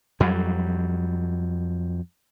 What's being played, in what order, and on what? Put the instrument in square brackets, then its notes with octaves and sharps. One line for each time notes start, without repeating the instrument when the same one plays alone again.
[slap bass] F2 F#3 G3